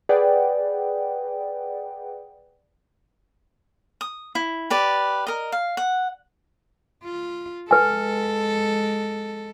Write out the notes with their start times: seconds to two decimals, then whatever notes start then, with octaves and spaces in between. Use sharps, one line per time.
0.09 G#4 B4 D5 F#5 G5
4.01 D#6
4.35 E4
4.70 G4 B4 D5
5.27 A#4 D#5
5.52 F5
5.77 F#5
7.04 F4
7.71 G#3 A4 B4 G#5